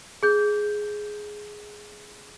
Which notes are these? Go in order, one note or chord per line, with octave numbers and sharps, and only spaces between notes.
G#4 G6